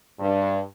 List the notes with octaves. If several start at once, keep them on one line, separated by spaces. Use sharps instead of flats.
G2